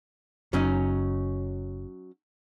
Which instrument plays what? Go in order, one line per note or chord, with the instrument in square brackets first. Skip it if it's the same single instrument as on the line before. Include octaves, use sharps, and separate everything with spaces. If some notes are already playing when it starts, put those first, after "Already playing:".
[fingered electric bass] F#1 [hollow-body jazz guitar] F#3 C#4 D#4